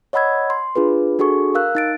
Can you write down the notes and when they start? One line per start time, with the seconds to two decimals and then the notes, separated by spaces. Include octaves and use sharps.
0.13 C#5 D#5 F#5 B5 E6 G#6
0.50 C6
0.76 D4 F4 G#4 B4
1.19 D4 F#4 G#4 A4 C#6
1.55 A#4 F5 E6 F#6
1.75 D#4 A6 D7